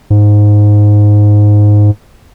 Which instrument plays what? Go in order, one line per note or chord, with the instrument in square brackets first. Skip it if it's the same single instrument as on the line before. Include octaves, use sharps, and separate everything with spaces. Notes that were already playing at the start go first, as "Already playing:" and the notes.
[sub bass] G#2